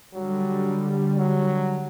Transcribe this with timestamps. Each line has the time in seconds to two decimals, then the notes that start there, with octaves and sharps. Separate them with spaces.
0.14 D3 F#3 G3
1.17 F#3